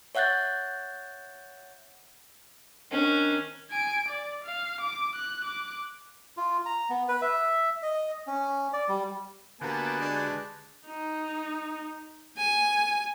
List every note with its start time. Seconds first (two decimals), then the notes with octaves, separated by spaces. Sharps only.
0.15 C#5 E5 F#5 F#6 G6 A6
2.91 D#3 C#4 D4
3.71 G#5 D7
4.09 D5
4.44 F5
4.81 D6
5.16 F#6
5.45 D6 F#6
6.37 F4
6.66 A#5
6.90 B3
7.08 B4
7.22 E5
7.83 D#5
8.27 C#4
8.73 D5
8.89 G3
9.61 D3 A#3 B3 F#4 G4 B4 G#5 A5
10.00 G#3 D4
10.86 D#4
12.37 G#5